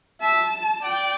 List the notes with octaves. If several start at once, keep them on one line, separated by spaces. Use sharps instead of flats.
E5 A5
D5 G5